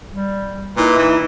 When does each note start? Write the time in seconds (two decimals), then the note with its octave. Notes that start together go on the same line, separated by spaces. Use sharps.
0.12 G3
0.77 A#2 D#4 E4 B4
0.98 E3